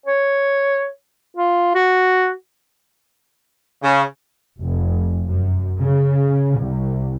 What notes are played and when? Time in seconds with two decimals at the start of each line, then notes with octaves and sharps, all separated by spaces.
0.06 C#5
1.36 F4
1.75 F#4
3.82 C#3
4.61 F1
5.27 F#2
5.80 C#3
6.58 C2